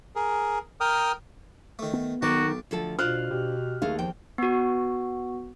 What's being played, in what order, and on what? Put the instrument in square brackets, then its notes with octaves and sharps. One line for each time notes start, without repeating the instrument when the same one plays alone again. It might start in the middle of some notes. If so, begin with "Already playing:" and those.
[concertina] G#4 A#4
A#4 G5 D#6 F6
[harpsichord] D#3 A3
[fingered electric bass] B3
[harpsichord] B1 A5 D6 [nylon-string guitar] D#3 [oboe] F#4
[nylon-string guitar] D2 F3 A4
[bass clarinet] B2 [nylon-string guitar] D4 F4 C5 [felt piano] F6 F#6
[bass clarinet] B2 [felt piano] G4
[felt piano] D#2 [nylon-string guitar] A3 G#4 F5
[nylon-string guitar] E2 G5 [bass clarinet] F3
[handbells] B3 F#4